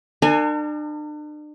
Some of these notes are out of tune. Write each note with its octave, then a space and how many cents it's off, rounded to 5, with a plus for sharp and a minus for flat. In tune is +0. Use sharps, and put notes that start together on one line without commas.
D4 +40 A#4 -40 G#5 +0